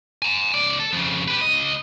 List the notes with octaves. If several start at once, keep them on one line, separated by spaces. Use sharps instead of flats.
G#5 A#5
C#2 D5
A4
F2 C#3
G4 B4
C#2 D#5